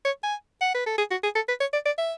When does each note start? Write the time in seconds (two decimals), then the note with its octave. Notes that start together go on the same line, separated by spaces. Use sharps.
0.05 C#5
0.23 G#5
0.61 F#5
0.74 B4
0.86 A4
0.98 G#4
1.11 F#4
1.23 G#4
1.35 A4
1.48 B4
1.60 C#5
1.73 D5
1.85 D5
1.98 E5